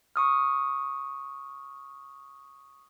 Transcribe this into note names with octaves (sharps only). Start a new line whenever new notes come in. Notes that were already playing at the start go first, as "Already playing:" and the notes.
C#6 D#6 F6